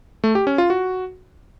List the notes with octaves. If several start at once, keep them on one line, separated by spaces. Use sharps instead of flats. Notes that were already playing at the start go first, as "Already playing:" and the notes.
A3
G4
C#4
F4
F#4